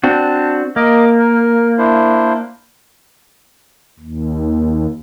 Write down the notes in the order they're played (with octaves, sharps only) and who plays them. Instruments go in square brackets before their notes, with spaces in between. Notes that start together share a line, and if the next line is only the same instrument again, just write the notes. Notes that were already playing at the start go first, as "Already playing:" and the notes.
[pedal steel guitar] C4 D4 F#4 [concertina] A5
[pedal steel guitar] A#3 [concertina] A#4 D#5 D6
[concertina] A#4
D4 E4 C5
[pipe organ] D#2